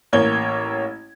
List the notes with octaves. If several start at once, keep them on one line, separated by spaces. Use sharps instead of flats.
A1 A#3 C#5 G#6 G7